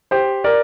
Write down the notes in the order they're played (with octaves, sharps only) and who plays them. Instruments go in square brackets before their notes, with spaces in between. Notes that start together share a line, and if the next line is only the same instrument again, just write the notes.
[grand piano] G4 C5
A#4 D5